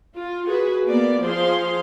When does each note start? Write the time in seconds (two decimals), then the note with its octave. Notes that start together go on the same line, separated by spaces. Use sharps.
0.17 F4
0.48 F#4 G#4 B4
0.88 A#3 B3 D5
1.24 F3 G#4 C5 F5 C6